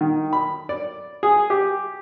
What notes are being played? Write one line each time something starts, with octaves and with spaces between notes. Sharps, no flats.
D#3
B5
D5
G#4
G4